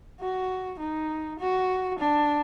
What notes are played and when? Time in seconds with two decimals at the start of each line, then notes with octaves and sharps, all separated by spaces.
0.20 F#4
0.79 D#4
1.39 F#4
1.99 D4